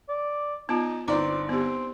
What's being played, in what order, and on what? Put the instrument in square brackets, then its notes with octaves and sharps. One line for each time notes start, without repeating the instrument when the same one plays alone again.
[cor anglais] D5
[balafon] B3 F4 [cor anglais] D#4 [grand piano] A5
[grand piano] G1 D5 [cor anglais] C4 [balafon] D#4 A#5 D6
[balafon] B3 G4 [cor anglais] C4